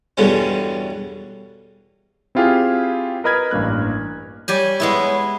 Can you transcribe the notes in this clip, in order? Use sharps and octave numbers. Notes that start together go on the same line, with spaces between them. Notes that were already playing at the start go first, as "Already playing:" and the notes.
E2 G2 B2 D3 G3 C#4
C4 E4 F4 G4 G#4 F5
A#4 B4 D#5 B5 F6 G#6
A1 G2 A#3 F#6
G3 G4 C#5 G#5
G#3 B3 E4